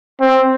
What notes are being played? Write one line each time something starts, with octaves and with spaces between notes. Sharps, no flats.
C4